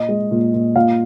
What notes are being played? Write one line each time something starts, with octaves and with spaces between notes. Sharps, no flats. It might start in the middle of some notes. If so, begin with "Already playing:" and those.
Already playing: A#2 D#5
G#3
A#2
A#2
A#2 F5